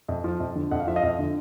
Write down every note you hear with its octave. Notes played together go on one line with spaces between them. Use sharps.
F2
F3
F2
D3
F2 F#5
F5
F3 E5
D#5 F5
F2
D3